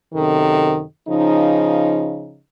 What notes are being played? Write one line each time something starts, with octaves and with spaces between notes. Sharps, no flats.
F#2 C3 D#3 A4
C#3 F3 D#4